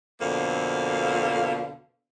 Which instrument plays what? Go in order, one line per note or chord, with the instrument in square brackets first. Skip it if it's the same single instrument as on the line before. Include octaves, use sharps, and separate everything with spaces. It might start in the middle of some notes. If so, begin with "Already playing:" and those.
[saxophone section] F2 B2 D3 A#3 F5